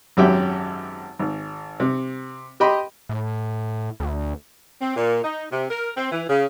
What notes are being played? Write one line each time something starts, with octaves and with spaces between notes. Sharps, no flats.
G#1 F#2 F#3 G4 E5 G5
G#1
C3
G4 D#5 G5 B5 C6
A2
D2
C4
A#2
D#4
C3
A#4
C4
E3
C#3